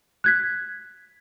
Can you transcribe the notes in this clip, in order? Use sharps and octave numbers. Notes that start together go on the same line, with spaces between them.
F#6 G#6 B6